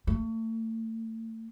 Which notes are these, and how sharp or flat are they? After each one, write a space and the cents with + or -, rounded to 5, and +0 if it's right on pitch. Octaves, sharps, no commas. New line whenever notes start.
A3 +35